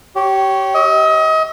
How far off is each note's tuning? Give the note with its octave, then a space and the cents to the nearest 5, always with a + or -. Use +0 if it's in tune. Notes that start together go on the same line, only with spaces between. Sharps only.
G4 -25 C#5 +0
D#5 +35 E6 +0